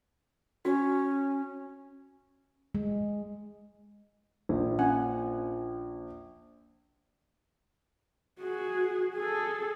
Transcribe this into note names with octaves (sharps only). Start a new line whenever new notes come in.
C#4 F#4
G#3
A#1
C#4 F#5 G#5
F#4 G#4
G#4 A4